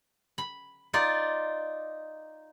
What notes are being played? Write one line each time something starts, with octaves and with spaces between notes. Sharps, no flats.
B5
D#4 F4 D5